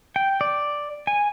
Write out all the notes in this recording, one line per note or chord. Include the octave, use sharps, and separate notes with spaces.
G5
D5
G#5